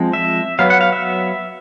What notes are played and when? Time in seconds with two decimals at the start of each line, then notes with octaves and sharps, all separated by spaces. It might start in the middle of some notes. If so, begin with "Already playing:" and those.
Already playing: F3 G#3 C4
0.13 E5
0.59 F#3 B3 F5
0.70 F#5
0.81 F5
0.92 E5